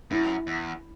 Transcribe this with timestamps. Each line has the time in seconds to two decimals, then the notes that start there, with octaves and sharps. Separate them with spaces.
0.11 F#2 E4
0.47 E2